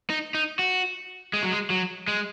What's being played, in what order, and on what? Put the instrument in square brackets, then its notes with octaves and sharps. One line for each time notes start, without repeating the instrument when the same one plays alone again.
[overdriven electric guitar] D#4
D#4
F#4
G#3
F#3
G#3
F#3
G#3